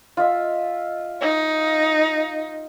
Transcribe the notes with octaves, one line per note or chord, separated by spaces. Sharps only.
F4 D#5 E5
D#4